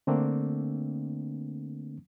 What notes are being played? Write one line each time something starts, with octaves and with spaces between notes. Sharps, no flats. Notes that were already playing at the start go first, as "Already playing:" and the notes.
D3 A3 A#3 C4 D4